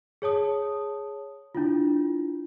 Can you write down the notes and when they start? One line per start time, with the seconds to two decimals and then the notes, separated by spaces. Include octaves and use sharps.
0.22 G#4 C#5 A5 D#6
1.55 D4 E4 F4